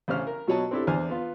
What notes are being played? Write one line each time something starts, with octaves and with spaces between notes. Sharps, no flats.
A1 C#3 C#4 C5 F6
A#4
B2 F#3 F#4 C#5 D#5 A5
C4 D4 E4 G4 A4
E2 D4 C5 G#5 F6
B3 F4